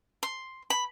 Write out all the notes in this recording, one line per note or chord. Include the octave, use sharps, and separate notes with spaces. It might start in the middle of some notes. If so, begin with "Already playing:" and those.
C6
B5